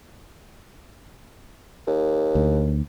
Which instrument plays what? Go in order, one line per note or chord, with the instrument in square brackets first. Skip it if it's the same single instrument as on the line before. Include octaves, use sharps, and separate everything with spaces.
[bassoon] D#2
[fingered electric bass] D2